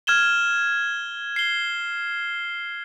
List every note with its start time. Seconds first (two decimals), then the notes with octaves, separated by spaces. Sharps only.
0.07 F6 G#6 E7 G7
1.36 C7 G7